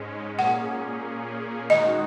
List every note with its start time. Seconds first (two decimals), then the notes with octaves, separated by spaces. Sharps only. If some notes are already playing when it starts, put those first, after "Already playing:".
Already playing: G#2 G#3 C#4
0.39 A#2 A#3 C#4 G#4 F#5
1.70 D#3 G#3 D#4 F#4 D#5